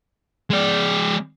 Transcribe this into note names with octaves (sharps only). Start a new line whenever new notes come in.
G#3 D5